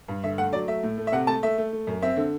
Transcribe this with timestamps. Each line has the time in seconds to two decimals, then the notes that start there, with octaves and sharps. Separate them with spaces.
0.08 G2
0.24 D3 E5
0.38 A3 F#5
0.53 F#3 D5
0.68 A3 E5
0.83 A2
0.97 A3
1.07 E5
1.12 C3 F#5
1.27 A3 A5
1.43 A3 E5
1.58 A3
1.72 A3
1.87 F#2
2.02 C4 E5
2.17 D3